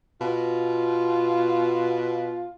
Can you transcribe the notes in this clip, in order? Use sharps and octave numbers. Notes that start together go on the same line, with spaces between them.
B2 F4